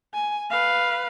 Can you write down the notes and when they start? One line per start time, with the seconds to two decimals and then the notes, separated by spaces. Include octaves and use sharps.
0.14 G#5
0.50 B4 F5